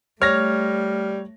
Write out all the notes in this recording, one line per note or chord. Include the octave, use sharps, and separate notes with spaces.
G3 A3 C#5 F6 A#6